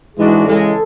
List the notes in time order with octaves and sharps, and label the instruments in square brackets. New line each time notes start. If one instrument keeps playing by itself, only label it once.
[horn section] G#2 E3 G#3 D4 F#4 [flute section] G#4
[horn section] C#3 E3 G#3 [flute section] A4